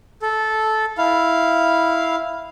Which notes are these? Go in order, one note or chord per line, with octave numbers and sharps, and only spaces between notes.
A4
E4 F5